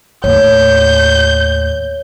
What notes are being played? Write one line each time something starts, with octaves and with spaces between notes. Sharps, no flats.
D#2 A2 C#5 G6